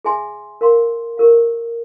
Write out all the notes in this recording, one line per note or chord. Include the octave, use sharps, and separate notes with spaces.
G#4 E5 G#5 C6
A#4 F5 C6
G4 A#4 F5